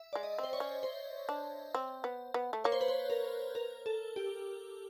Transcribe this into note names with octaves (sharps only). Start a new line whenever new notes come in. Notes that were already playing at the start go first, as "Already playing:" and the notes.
Already playing: E5
G#3 D5
D#5
C4 C5
C#5
C#4
C5
D4
C4
B3
B3
A3
A#3 C#5
C5
B4
C5
A#4
A#4
A4
G4